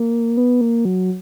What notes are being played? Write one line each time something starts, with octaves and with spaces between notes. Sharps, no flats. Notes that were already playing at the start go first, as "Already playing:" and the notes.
Already playing: A#3
B3
A#3
F#3